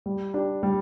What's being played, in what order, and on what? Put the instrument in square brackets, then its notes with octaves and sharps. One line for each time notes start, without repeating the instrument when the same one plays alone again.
[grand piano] G3
D4 G4
G3